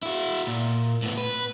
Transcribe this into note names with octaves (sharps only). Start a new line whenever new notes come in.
E4 F#4
A#2
A2 B3
B4